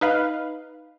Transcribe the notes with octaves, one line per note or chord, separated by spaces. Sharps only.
D#4 B4 F5